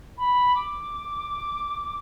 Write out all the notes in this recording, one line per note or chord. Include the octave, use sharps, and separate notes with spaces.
B5
D6